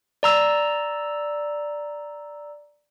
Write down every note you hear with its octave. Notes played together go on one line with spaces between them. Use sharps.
D5 A#5 E6